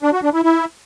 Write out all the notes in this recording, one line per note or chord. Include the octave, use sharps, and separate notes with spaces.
D4
F#4
D4
E4
E4